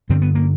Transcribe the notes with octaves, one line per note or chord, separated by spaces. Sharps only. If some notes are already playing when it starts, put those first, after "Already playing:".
G2 D3 C4
B3
A#3